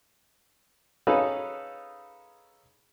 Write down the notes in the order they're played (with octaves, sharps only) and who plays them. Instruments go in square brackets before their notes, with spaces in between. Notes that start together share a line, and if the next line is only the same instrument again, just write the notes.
[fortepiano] C#4 D#4 G#4 A4 B4 F5